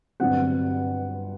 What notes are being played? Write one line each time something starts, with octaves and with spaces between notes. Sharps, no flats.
G1 G2 F#3 C4 F#5